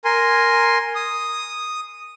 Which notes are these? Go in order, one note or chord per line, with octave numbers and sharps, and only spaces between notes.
A#4 G#5 C6
D#6